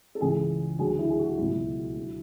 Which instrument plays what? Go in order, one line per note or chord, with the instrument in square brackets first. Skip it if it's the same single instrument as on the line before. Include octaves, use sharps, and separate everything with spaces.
[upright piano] A4
C#2 C#3 E3 G#4
D2 D3 F#3 G#4
E4
G#4
F#4
C#2 B2 F#3 E4
D3 F#3